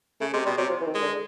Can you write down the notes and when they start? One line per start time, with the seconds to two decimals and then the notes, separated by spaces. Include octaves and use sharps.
0.21 C#3 A3
0.33 C3 G#3
0.46 B2 G3
0.58 C3 F#3
0.70 F3
0.81 E3
0.86 D#3
0.95 G#3
1.02 D3